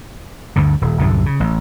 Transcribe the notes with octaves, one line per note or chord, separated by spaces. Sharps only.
D2 G2 D3
D#1
C2 F#2 A2 D3
C#3
A1